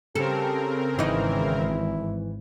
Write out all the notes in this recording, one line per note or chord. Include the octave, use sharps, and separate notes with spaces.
C#3 C4 G4 A4 A#4
G#1 E3 D#4 E4